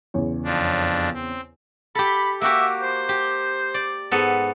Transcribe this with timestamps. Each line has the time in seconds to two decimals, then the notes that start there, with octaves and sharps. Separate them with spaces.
0.14 E2 C#3 C#5
0.44 F2 F3 D4
1.14 C4
1.95 G4 A4 B5
2.42 A#3 F#4 G4 E5
2.83 C5
3.09 G4
3.74 D5
4.11 G#2 B3 A4